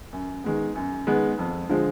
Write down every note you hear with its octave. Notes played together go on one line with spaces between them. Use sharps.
F#2
D#3 G#3 B3
F#2
D#3 G#3 B3
F2
D3 F3 G#3